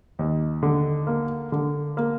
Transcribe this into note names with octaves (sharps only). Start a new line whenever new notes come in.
D#2
D3
A#3
D3
A#3